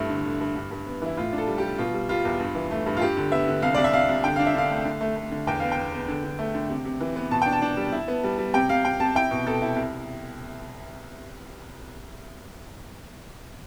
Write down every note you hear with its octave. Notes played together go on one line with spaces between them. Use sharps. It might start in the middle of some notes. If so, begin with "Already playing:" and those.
Already playing: G2 A3 E4
D3
D3
G2
G2
G2
B3
E3 E4
A2 F4
D4
A4
G3
G3 G4
B2 F4
G3
G3 F4
E2
G2
E3
A3
G2
F4
G2 G4
D3
B3 E5
D3
C2 F5
C2 D5
E5
C2 F5
C2
D3 G5
D4 F5
E5
D3 F5
A3
D3
A3
A3
D3
E2 G5
B3 F5
G5
B3
B3
D3
D3
A3
D3
C3
C3
E3
B3
B2 A5
D4 G5
A5
D4
G3
E4
B3
G3
G3
C3 G5
C3 F5
C3 G5
C3 A5
E4 G5
B2
B2 A4
E4
C2